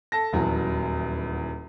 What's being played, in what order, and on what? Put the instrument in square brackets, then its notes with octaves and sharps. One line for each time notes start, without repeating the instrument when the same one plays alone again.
[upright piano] A4 A5 A#6
D#1 E2 F#3